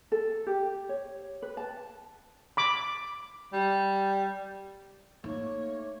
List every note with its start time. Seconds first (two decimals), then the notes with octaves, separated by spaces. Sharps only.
0.12 A4
0.47 G4
0.89 C#5
1.42 B4
1.57 A5
2.57 B5 D6
3.53 G3
5.24 A3 A#3 D#4 C#5